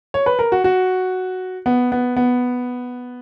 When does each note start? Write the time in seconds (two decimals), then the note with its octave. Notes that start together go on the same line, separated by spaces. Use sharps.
0.14 C#5
0.26 B4
0.39 A#4
0.52 F#4
0.64 F#4
1.66 B3
1.92 B3
2.17 B3